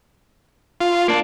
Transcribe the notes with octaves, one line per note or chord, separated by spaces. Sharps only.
F4
A#3 D4